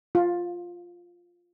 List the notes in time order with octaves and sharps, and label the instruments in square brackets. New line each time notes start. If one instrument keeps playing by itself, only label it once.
[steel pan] F4